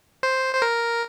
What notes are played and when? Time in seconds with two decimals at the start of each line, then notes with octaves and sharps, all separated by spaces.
0.23 C5
0.55 C5
0.62 A#4